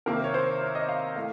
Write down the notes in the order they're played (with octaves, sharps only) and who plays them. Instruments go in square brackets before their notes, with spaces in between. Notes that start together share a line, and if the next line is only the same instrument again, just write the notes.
[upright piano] C3 D#3 A#3 A#4
C#5
C5
C#5
D#5
F5
A2 A3 F5